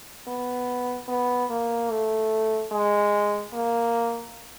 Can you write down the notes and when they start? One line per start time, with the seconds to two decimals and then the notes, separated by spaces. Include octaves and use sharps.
0.28 B3
1.08 B3
1.50 A#3
1.90 A3
2.72 G#3
3.53 A#3